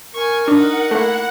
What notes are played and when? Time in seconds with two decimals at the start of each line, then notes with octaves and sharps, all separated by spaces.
0.14 A#4 G#5 C#6
0.48 D4 D#4 F#5
0.91 A3 A#3 E4